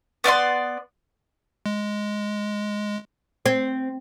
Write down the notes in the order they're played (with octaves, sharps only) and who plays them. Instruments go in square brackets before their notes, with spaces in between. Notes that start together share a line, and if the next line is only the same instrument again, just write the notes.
[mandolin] B3 D5 E5 C6
[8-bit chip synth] G#3
[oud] C4